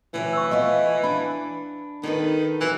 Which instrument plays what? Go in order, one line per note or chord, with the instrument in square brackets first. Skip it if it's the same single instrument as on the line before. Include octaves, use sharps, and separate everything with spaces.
[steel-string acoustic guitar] D2 C3 F#3 [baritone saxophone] E3
[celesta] C#6 E6
[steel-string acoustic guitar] F3 A3 B3 [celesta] D#5 F5
[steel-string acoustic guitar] D4 [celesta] B5
[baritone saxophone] D#3 [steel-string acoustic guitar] D#4 A4 B4
[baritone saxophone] E3 [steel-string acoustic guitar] F#3 C4